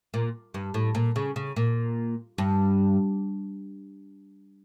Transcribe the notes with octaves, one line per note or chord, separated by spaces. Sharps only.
A#2
G2
A2
A#2
C#3
C#3
A#2
G2